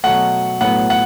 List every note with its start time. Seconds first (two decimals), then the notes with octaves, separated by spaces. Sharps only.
0.04 B2 F#3 A3 F#5
0.61 A2 F#3 B3 F#5
0.90 F#5